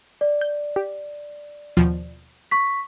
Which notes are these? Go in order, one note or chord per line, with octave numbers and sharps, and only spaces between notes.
D5
G6
G4
D#2 B2 F3
C#6 B6